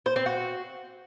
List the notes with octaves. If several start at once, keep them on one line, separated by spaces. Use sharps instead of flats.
C5
C4
F#4